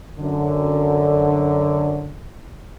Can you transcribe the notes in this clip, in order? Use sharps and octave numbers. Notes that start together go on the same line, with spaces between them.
F#2 D3